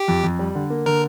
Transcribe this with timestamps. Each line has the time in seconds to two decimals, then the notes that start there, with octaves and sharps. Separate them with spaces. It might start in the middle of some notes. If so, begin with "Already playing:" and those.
Already playing: G4
0.08 F2
0.23 F2
0.39 G3
0.55 D3
0.70 A#3
0.86 D3 A#4